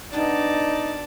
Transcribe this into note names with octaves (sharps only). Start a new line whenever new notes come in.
G2 B2 D4 D#4 D5 A5